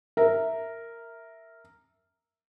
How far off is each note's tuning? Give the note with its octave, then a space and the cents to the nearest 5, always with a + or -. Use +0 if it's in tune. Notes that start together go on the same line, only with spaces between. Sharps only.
A#4 -10 E5 -5